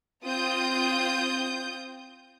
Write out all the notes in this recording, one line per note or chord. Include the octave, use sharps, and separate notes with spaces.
C4 F4 D#6 G6